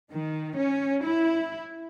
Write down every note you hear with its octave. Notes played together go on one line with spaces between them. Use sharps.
D#3
C#4
E4